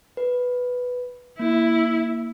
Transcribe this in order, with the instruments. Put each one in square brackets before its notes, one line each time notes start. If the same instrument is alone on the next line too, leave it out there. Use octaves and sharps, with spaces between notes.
[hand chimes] B4
[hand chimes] A#3 [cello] E4